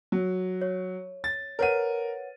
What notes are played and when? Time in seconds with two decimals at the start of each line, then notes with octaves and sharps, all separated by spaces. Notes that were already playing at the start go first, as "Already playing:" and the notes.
0.12 F#3
0.62 C#5
1.24 A6
1.59 A#4 B4 C#5 F#5 D#7